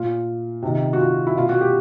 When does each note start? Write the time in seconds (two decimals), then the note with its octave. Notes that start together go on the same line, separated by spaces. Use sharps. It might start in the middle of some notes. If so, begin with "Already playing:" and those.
Already playing: A#2 F4
0.62 C3 D#3
0.93 F#4
0.99 F4
1.27 E4
1.35 B2 F4
1.49 F#4
1.61 G4